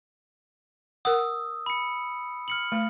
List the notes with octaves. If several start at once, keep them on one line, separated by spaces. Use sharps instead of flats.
A#4 F#5 D#6 E6
B5 C#7
F6 C#7 F#7
A3